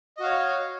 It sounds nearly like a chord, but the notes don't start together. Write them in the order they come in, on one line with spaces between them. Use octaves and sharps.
D#5 F#4 F5 C#5